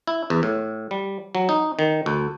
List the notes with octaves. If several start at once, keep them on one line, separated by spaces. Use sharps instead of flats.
E4
E2
A2
G3
F#3
D#4
D#3
D2